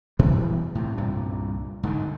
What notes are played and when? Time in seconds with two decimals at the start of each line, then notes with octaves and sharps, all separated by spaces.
0.19 B2 E3 G3 G#3
0.75 A2 C3
0.97 C2 G2 A#2
1.83 G#2 D3 D#3